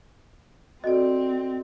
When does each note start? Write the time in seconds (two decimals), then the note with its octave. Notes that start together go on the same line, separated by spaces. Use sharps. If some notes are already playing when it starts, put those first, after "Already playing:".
0.84 C4 F#4 A4 D5 D#5